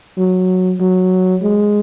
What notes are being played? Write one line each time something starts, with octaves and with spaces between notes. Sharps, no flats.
F#3
F#3
G#3